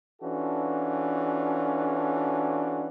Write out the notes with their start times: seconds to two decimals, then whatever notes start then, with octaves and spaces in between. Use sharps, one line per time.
0.22 E3 C#4 D4 F4 F#4 A4